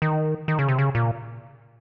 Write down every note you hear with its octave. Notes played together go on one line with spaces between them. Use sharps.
D#3
D#3
C#3
C3
C#3
A#2